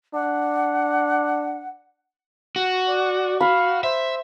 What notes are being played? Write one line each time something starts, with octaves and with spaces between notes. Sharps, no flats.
D4 F#5
F#4
D5
F5 B5
C5 E5